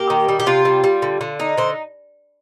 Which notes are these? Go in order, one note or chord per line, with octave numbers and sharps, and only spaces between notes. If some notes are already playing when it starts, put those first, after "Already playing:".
Already playing: A#3 G4
D#3
G3
G4
C3 F4
G3
G3
D3
D3
D#4
D3 C5